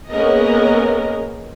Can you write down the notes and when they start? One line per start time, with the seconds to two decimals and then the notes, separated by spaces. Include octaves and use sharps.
0.11 A#3 B3 C#4 G#4 A#4 D#5